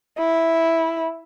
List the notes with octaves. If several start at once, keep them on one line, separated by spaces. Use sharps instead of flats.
E4